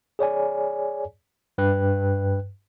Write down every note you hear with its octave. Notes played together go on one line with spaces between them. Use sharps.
G#4 C#5 D5 G#5
G2 B4 G5 F#6